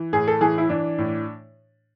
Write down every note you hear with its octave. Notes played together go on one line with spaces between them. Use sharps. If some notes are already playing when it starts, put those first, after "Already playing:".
Already playing: E3
A2 G#4
A4
E3 G#4
E4
E3 D4
A2